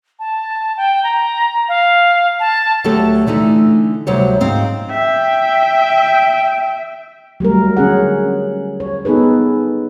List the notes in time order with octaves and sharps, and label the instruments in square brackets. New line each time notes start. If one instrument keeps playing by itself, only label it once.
[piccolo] A5
G5
A#5
F5
A5
[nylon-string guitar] D2 F#3 A3 G4 A4
D3 E3 A3 D#4
D2 C3 F#3 G3 C5 C#5
G#2 C4 F5
[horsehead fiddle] E5 [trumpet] G5
[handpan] F#3 G3 A3 A#4
D3 C#4 G#4 F#5
C#5
B3 D#4 G#4 A4 B4